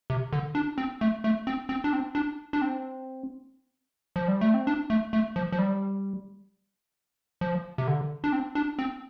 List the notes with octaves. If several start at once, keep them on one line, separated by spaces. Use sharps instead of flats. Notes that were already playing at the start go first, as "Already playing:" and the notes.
C3
D3
D4
C4
A3
A3
C4
C4
D4
C4
D4
D4
C4
F3
G3
A3
C4
D4
A3
A3
F3
F3
G3
F3
C3
D3
D4
C4
D4
C4